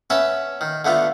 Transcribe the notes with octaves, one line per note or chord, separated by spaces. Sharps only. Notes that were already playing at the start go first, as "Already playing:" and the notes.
C#4 B4 E5 F#5 A5
D#3
D3 A3 B3 F4